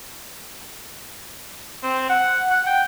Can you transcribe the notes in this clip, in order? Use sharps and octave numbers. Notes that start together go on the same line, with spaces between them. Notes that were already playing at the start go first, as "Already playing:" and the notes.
C4
F#5
F#5
G5